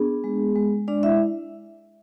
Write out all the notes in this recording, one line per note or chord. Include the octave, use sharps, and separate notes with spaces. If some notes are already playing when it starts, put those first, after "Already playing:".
Already playing: B3 D4 G#4
G#3
G#3
G#3 D4 D5
E4 E5